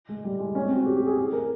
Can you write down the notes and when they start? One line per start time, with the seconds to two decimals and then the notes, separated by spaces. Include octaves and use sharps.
0.09 G#3
0.24 G3
0.40 G#3
0.55 C#4
0.66 C4
0.76 F#4
0.86 G4
0.97 G4
1.07 G#4
1.17 G#4
1.33 A#4